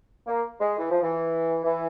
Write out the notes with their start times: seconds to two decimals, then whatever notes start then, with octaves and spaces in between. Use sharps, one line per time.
0.26 A#3
0.60 G#3
0.79 E3
0.90 F3
1.02 E3
1.64 E3